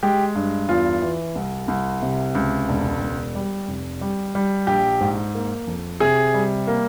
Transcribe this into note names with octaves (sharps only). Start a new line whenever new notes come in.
G#3 G4
G2
E2 F4
E3
C2
C2
C3
C#2
E1
E1
G3
F1
G3
G3
A#1 G4
G#2
A#3
F2
C3 G#4
G3
A#3